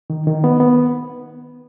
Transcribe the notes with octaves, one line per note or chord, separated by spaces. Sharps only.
D#3
D#3
B3
B3